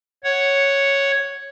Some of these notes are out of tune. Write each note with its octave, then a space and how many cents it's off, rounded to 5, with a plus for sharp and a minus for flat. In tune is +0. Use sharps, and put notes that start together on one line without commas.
C#5 +0 F#5 +0